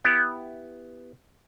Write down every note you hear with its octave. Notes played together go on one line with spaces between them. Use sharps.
B3 E4 G4